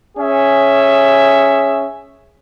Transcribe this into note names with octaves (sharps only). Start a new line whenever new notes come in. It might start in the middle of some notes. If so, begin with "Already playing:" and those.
C#4 G#4 C#5 E5